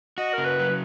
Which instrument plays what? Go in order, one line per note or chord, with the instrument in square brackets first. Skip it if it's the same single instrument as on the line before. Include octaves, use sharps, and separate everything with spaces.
[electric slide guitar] F#4 [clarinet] D#5
[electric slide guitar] C#3 [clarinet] A#4
[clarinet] B4
[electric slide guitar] F#3